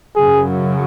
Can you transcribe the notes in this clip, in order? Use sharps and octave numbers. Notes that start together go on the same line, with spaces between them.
F#2 C#3 F#3 G#4